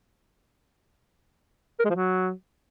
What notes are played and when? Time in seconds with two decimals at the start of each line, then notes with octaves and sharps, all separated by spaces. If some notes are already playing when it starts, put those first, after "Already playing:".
1.80 A#4
1.85 G#3
1.90 F3
1.95 F#3